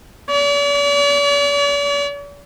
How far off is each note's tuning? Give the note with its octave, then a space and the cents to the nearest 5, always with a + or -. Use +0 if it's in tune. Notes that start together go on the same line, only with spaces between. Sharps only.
D5 -45